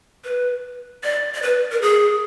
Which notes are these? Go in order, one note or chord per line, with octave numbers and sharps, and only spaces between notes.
B4
D5
D5
B4
A#4
G#4